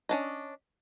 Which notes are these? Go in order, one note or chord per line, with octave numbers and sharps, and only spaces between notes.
C#4 D4 D#5